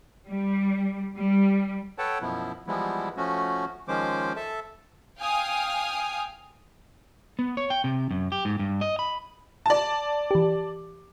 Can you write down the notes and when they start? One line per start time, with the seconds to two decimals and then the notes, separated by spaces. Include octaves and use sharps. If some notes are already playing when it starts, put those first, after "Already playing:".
0.27 G3
1.18 G3
1.98 A4 B4 C#5 F#5 G5 A5
2.21 F#2 B2 F3 B3 E4
2.67 E3 F3 G3 G#3 B3 E4
3.17 F3 A3 C#4 F#4
3.88 D#3 F3 G#3 C#4 C5 D6
4.36 A4 E5 A5
5.18 F5 G5 G#5 D#6 F6
7.39 B3
7.57 C#5
7.70 G5
7.84 C3
8.11 F#2
8.32 G4
8.45 G#2
8.59 G2
8.81 D#5
8.99 B5
9.66 D5 A5
10.31 E3 G4